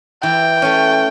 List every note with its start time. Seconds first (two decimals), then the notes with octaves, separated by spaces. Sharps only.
0.23 E3 G5
0.62 A3 C#4